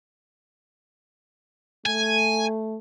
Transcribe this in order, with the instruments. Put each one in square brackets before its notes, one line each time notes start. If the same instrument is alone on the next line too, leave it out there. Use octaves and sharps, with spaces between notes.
[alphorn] A3 [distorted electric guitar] G#5